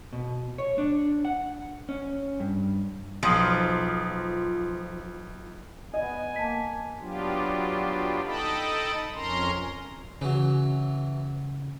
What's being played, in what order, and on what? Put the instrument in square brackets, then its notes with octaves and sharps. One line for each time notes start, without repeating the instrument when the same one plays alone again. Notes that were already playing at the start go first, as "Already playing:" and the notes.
[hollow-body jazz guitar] B2
C#5
D4
F#5
C#4
G2
[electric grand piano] B1 D#6 [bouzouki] F3
[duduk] B3 [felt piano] D#5 [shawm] G#5
[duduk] A#3 [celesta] A5 B6
[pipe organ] F#3 B3 D4 F4 G4
D#4 A4 D#5 G5 A5 B5
F2 C#4 A#4 A#5 C6
[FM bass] C#3 [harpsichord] E3 F#3